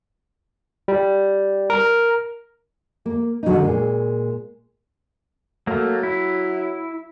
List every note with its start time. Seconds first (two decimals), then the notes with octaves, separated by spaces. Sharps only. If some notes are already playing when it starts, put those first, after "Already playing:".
0.88 G3
1.70 A#4
3.06 A#3
3.43 D3 F#3 G#3 C4 D4 D#4
3.62 A#2 G#3
5.67 F#3 A3 A#3
6.03 E4